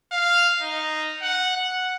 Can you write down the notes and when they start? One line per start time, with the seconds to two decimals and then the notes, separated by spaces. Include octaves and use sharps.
0.12 F5
0.61 D#4
1.22 F#5
1.57 F#5